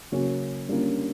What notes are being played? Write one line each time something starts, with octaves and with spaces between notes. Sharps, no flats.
C#3 F#3 A#3 C#4
D3 G3 A#3 C#4 F4